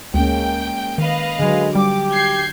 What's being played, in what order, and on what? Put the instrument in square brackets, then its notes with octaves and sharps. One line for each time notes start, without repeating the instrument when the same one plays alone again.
[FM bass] D2 [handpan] G#3 A#3 C#4 [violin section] G5
[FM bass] D#3 [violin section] B4 D#5 F5
[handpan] D3 F#3 [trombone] G#3
[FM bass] G3 [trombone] G4 [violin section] D6
[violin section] G6 G#6 C7